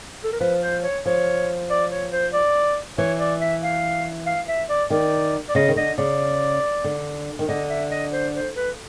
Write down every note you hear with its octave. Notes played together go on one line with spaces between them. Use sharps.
A4
A#4
F3 B4
C5
C#5
F3 C#5
D5
C#5
C5
D5
E3 C#5
D5
E5
F5
F5
E5
D5
D#3 D5
D5
C#3 D#5
D#3
D3 D#5
C#3 D5
D3
D#3
D3 D#5
E5
D#5
C5
C5
B4